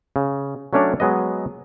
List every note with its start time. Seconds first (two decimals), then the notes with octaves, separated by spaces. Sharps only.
0.16 C#3
0.73 F#3 A3 C#4 D4 C#5 D5
1.00 F#3 G#3 B3 D#5